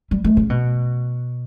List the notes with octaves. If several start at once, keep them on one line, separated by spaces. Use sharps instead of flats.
G3
A3
C#3
B2